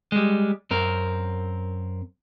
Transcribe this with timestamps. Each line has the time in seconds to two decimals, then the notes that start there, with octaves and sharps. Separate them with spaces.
0.12 G3 G#3
0.71 F#2 C4 A#4